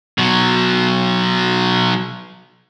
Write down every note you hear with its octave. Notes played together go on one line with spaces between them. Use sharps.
B2 F#3